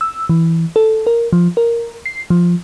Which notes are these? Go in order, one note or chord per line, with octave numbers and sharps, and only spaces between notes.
E6
E3
A4
A#4
F3
A#4
C7
F3